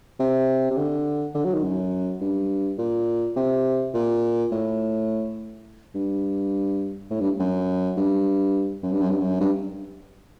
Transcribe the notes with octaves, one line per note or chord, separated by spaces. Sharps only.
C3
C3
D3
D3
F#3
D#3
F#2
G2
A#2
C3
A#2
A2
G2
A2
G2
F#2
G2
F#2
G2
F#2
G2
F#2
G2